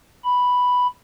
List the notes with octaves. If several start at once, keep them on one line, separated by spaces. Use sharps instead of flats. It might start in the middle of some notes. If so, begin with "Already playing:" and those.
B5